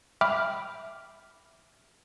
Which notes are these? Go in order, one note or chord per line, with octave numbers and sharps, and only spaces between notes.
E5 G5 B5 D6 F6